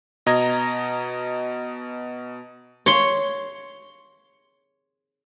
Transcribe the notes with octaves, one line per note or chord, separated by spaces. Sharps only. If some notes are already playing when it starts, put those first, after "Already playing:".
B2 D#5 A#5 G#6 A#6
C#5 C6